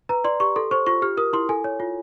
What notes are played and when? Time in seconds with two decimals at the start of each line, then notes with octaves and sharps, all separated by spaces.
0.09 B4 A#5
0.24 D5 C6
0.40 G4 C#6
0.56 A4 C6
0.71 C5 C#6
0.86 F4 C#6
1.02 G4 F6
1.17 A#4 D#6
1.33 E4 C6
1.49 A4 G#5
1.64 C#5
1.80 F4